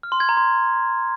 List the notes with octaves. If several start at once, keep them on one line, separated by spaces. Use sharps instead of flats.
F6
C6
G#6
A#5
C6